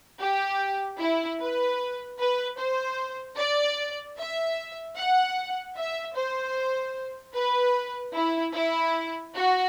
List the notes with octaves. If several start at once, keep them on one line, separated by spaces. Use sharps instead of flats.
G4
E4
B4
B4
C5
D5
E5
F#5
E5
C5
B4
E4
E4
F#4